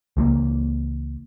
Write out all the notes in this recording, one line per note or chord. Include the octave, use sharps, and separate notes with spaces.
C#2 E3 G3 A#3